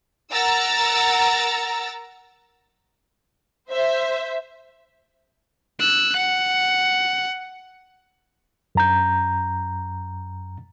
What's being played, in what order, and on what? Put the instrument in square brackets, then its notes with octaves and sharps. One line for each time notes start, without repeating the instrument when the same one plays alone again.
[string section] A#4 F#5 A#5 E6 A6
C5 E5
[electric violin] E6 F#6
F#5
[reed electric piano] F#2 A#5 G6